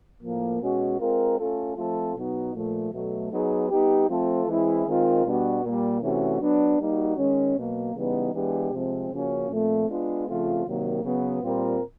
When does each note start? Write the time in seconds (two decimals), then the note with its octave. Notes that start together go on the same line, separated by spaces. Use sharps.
0.22 A2 F3 A#3
0.61 B2 G#3 C#4 F#4
0.99 G#3 C4 F4 A#4
1.38 A3 C#4 F4 A4
1.76 F3 A3 C4 F4 A4
2.15 B2 F#3 B3 D#4 F#4
2.54 A#2 F3 A3
2.92 B2 F#3 A3
3.32 F#3 B3 D#4 G#4
3.69 G3 B3 D#4 G4
4.08 F3 A3 C4 F4 A4
4.47 E3 G#3 C4 E4 G#4
4.86 D#3 G#3 C4 F4 A#4
5.24 B2 G3 B3 D4 F#4
5.63 A#2 G3 A#3
6.01 C3 E3 A3 C#4 F#4
6.40 F#3 B3 D4
6.78 G3 A#3 D#4 F#4
7.17 D#3 G#3 C#4
7.57 B2 F#3 A#3
7.94 C#3 E3 G3 B3 D#4
8.33 E3 G#3 B3 D4 G4
8.72 C3 F3 G#3 C4
9.11 C#3 F3 A#3 C#4 F#4
9.49 A#2 F3 A3 C4
9.87 G#3 B3 D4 F4 G#4
10.27 C#3 F3 A3 C4 F4
10.66 C3 D#3 F#3 A#3
11.03 C#3 F#3 B3
11.43 A#2 G3 C4 F4 A#4